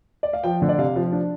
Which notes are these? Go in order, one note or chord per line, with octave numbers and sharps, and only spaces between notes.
D5
F5
F3 G5
D3
D5
C3 F5
F3
D4